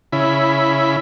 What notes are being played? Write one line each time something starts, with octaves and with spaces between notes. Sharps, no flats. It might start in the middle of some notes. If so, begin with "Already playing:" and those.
C#3 E4 B5